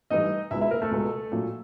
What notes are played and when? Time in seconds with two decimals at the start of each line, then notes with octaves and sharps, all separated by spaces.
0.10 G2 E3 A3 D#4 D#5
0.51 C#2 B2 G#3 E4 E5
0.61 E4 E5
0.71 A#3 A#4
0.82 A3 A4
0.91 C#2 B2 G#3
1.32 A#2 F#3 A3